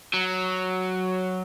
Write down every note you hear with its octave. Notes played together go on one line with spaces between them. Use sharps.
F#3